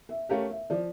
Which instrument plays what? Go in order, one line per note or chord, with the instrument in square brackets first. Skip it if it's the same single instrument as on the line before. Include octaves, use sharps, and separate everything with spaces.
[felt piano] E5
[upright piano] A3 C#4 G4 A#4 [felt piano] F5
[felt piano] E5
[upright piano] F3 [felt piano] D5